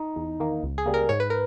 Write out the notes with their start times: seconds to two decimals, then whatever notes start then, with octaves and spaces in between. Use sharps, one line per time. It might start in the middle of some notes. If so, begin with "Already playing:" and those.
Already playing: D#4
0.16 E2
0.40 D#3 A#3
0.63 C#2
0.78 G#4
0.86 C#3 G3 A#3
0.94 A#4
1.09 G#2 C#5
1.20 B4
1.30 A#4